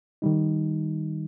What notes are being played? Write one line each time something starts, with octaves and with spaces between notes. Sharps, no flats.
D#3 G3 D#4